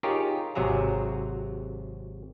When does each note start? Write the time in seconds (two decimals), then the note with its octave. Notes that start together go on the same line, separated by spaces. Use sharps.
0.03 D#4 F4 G4 G#4 A#4 C#5
0.55 G#1 C3 F#3 G#4 E5 A#5